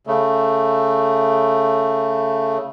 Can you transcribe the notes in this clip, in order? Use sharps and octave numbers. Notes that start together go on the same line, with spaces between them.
C#3 A3